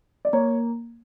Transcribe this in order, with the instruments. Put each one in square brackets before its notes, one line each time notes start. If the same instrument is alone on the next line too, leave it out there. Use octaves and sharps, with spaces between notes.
[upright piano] D5
[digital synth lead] A#3 [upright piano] C#5